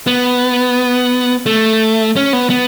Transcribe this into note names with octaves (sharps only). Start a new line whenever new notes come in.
B3
A3
C#4
B3
B3